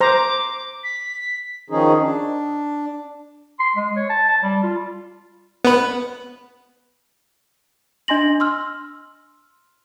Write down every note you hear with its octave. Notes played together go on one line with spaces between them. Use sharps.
C5 A#5 D6
B6
D#3 F3 C#4 D#4 G#4
D4
C6
G#3
C#5
A5
A5
G3
F4
B3 B4
D4 D#5 G#5 C6 A#6 F#7
C6 E6 F6